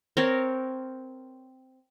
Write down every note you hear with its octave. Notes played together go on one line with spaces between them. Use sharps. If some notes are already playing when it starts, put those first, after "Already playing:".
C4 A#4 C#5